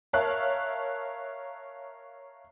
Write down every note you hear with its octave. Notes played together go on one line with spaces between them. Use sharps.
A#4 C#5 E5 F5 A5 F#6